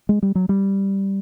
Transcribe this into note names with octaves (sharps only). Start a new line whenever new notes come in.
G#3
G3
F#3
G3